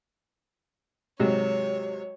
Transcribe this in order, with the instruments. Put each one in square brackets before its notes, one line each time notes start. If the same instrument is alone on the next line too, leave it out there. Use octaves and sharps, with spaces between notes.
[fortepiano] G#2 C3 F#3 [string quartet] C#5